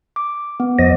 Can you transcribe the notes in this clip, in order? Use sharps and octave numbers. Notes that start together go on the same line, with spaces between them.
D6
B3
F2 F3 D#5